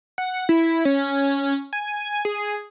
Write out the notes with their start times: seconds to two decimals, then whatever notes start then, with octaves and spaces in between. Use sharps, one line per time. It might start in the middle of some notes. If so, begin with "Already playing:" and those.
0.18 F#5
0.49 E4
0.85 C#4
1.73 G#5
2.25 G#4